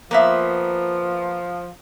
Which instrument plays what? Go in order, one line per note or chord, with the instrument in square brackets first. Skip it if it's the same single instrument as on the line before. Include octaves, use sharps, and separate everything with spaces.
[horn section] F3 [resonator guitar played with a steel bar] A#3 B3 E5